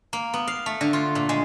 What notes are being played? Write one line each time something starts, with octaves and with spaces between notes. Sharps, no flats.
A#3
B3
F5
A3
D3
F4
A#2
G#3